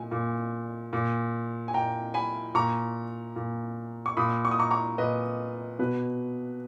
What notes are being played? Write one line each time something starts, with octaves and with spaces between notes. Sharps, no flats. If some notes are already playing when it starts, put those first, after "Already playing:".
Already playing: A#2 G#5
A#2
A#2
G#5
A#2 G5 A#5
G#5 B5
A#2 A#5 C#6
A#2
C#6
A#2 B5 D#6
C#6
D#6
A#5 C#6
A#5 C#6
A#2 B4 D#5
B2 B4